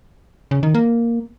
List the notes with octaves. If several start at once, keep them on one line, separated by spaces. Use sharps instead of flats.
C#3
D#3
A#3